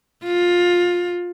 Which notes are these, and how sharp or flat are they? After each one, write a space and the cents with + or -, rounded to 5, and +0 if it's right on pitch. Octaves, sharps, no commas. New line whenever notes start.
F4 +15